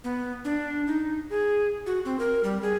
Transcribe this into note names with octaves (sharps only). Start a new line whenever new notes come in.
B3
D4
D#4
G#4
F#4
C4
A#4
G3
G#4